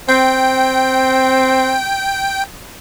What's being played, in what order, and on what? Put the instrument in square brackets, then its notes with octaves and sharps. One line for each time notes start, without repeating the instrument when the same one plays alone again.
[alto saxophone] C4 [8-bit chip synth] G5